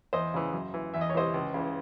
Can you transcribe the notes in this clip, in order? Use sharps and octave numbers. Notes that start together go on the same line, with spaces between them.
E2 C5 D#5
C#3 E3
F#2
E3
E2 E5
D#5
C#5
C3 E3 C5 D#5
C#2
C#3 E3